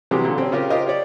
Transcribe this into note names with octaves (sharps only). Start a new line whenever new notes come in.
C3 E3 F#3 G3 G4 G#4
A#2 D3
C4 C#4
C#3 C#4 F4 G4 A#4
F4 G4 A#4 C5 D#5
F4 G4 C#5 D5